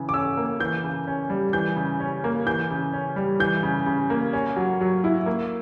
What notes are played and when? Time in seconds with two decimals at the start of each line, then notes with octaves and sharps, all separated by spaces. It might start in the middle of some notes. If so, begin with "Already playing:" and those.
Already playing: C#3 E3
0.09 D6
0.14 C#4 E6
0.37 A#3
0.60 E3 G6
0.84 C#3
1.07 C#4
1.30 G3
1.53 E3 G6
1.76 C#3
2.00 C#4
2.24 A#3
2.46 E3 G6
2.70 C#3
2.93 C#4
3.16 G3
3.40 E3 G6
3.63 C#3
3.86 C#3
4.10 A#3
4.33 C#4
4.56 F#3
4.81 F#3
5.04 E4
5.26 A#3